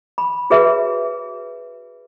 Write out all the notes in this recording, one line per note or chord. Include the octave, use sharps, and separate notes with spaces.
B5
F#4 G#4 B4 C#5 E5